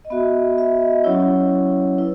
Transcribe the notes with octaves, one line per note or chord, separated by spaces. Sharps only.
D#5
B3 F#4 E5
E5
D#5
F#3 C#4 E4 C#5
E4 B4